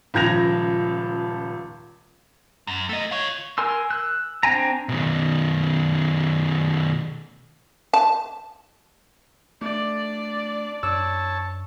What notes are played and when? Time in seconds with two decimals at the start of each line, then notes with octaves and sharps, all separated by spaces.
0.14 D#1 C#2 F3 G#6 A#6 F7
2.67 F#2
2.89 A3 D#5
3.11 F4 C#5
3.58 A#4 G#5 C6 E6
3.90 E6 F#6
4.43 C4 D4 G5 G#5 A#5
4.89 B2 D#3
7.94 A5
9.61 A3 D4 D5
10.83 F#2 D4 C#5 A5 E6